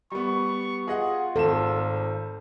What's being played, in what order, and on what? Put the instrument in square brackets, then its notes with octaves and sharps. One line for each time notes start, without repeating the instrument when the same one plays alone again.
[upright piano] G3 B3 [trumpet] C#6
[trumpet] F4 [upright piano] G#4 D#5 F#5
[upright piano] G#1 E7 [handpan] A4